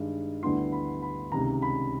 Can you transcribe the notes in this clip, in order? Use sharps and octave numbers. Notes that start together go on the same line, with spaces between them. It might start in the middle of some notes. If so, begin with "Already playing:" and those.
Already playing: G2 D#3 G#3
D2 D3 G3 B3 E4 C6
B5
B5
C#2 C3 D#3 A#5
B5